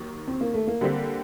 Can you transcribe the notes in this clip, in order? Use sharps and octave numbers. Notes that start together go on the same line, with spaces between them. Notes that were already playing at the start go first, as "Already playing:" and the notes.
Already playing: D#2 D#3 F#3
C4
A#3
A3
A#3
D3 G3 C4 G4